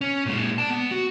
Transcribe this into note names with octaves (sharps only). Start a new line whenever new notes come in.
C#4
A#2 G#3
D5 A5
B3
F#4